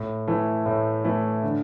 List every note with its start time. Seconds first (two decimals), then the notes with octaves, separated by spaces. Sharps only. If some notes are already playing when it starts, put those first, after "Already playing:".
Already playing: A2
0.27 E3 A3 E4
0.66 A2
1.04 E3 A3 E4
1.43 D3